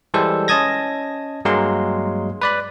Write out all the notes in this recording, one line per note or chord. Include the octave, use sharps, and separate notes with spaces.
E3 G3 G#3 A4 C5
C#4 D#5 A5 D#6 G#6 A#6
G2 F#3 G#3 A#3 A#4 C6
B4 D5 B5